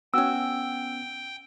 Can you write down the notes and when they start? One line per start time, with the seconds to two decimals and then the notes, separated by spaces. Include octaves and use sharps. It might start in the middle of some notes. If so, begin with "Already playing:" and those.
0.14 B3 C#4 F#4 G5 G#5 E6